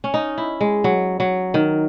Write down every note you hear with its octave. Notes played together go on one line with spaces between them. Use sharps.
C#4
D#4
E4
G#3
F#3
F#3
D#3